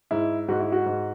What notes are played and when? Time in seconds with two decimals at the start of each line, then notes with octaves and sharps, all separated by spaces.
0.11 G#2 E4
0.48 G#2 F#4
0.60 E4
0.72 F#4
0.86 G#2